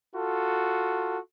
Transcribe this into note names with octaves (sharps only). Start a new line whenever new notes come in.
F4 F#4 A4